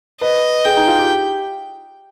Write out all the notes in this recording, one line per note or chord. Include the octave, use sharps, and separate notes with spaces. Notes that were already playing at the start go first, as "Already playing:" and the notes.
B4 D#5
G#4 G5
D#4
F4
G4